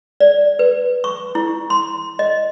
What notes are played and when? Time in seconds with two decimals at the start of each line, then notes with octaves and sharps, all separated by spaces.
0.20 D5
0.59 B4
1.04 C#6
1.35 E4
1.70 C6
2.19 D#5